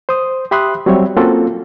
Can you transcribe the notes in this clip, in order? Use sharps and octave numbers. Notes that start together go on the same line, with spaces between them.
C5 D#6
G4 E5 B5 C6 D#6 F#6
F#3 G3 C4 C#5 E5
A#3 C4 C#4 F4 F#4 A4